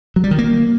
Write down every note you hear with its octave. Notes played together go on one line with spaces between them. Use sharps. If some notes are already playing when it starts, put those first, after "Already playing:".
F#3
G3
D#3
A#3